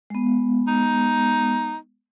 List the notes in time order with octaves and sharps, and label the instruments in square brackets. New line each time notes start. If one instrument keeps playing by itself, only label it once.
[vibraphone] G#3 B3
[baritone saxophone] D#4